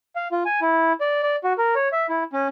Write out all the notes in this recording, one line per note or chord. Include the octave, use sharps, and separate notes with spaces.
F5
F4
G#5
E4
D5
D5
F#4
A#4
C#5
E5
E4
C#4